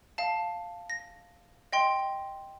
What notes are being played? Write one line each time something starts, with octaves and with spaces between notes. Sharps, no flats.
F5 A5
A#6
D#5 G5 C6